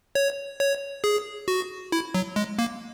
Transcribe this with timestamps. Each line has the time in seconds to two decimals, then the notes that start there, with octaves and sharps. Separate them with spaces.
0.15 C#5
0.60 C#5
1.04 G#4
1.48 F#4
1.92 E4
2.14 F#3
2.36 G#3
2.58 A#3